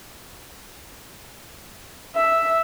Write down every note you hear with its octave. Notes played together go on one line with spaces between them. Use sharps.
E5